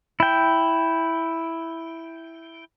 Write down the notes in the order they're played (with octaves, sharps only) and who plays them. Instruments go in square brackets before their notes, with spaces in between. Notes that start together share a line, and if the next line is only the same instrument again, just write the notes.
[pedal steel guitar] E4 G5